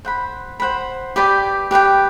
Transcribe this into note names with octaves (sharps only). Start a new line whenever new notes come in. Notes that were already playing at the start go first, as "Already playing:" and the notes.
C5 F#5 B5
C5 F#5 B5
G4 B4 D5 G5
G4 B4 D5 G5